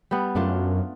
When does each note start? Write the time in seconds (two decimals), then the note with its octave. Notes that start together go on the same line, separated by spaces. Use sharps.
0.11 G3 B3
0.35 F#2 A3 D4 F4